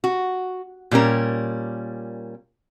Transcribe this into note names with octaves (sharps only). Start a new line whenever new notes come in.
F#4
A#2 G3 C#4 A#4